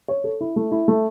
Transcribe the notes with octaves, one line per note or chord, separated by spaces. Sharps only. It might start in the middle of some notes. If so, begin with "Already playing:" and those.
C#5
A4
E4
A3
E4
A3